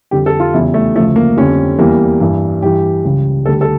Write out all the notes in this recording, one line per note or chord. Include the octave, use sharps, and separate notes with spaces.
F2 D3 G3 G4
A4
F4
E2 C#3 E3 G3 E4
A3
D2 C#3 F3 A3
A#3
F2 D3 G3 C#4
E2 E3 G3 A#3
G2 E3 G3
G2 E3 G3 G4
C#2 C#3 G3
D2 D3 G3 A4
A4